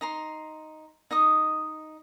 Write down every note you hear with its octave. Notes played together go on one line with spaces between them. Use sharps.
D#4 A#5 C6
D#4 D#5 D#6